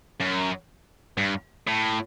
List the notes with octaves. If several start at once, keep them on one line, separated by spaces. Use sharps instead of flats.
F#2
G2
A2